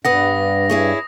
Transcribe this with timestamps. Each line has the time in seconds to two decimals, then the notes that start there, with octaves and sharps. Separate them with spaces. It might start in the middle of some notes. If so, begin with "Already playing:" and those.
0.05 G2 B3 B4 F#5 D#6 A#6
0.70 E4 G#4 C#5